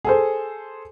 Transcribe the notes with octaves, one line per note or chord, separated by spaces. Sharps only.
G#4 A4 C5